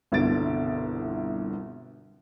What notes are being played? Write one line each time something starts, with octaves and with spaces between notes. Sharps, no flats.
G1 C2 B2 D3 A6 D7